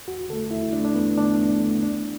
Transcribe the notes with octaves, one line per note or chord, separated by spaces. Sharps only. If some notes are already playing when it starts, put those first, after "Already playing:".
E2 F#4
D3 A3 A4
E2 E4
D3 A3 D4
D4
E2 B3
D3 A3 D4
E2
D3 A3
D2 D4